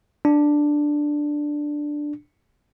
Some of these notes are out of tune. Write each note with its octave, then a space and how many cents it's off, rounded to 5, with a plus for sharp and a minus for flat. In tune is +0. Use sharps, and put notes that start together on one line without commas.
D4 +5